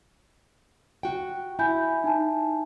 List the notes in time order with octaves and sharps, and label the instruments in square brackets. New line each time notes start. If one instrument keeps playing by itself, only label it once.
[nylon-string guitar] F#4 G5
[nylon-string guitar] E4 [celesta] G#5 B5 G6
[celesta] D#4 G#5 A5